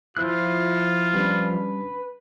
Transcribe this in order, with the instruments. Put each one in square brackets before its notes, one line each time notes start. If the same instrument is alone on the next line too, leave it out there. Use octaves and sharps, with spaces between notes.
[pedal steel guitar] F3 C5 F#6 [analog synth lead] E4 [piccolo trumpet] F4
[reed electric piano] G3 C#4 D4 [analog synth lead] B4